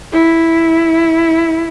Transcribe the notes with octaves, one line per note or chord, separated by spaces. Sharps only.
E4